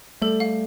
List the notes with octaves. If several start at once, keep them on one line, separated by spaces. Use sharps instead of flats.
G3 A3 A4
F5